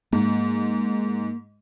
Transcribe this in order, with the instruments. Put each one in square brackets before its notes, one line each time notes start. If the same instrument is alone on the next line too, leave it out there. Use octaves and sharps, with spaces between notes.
[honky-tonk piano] G#2 [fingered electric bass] A#3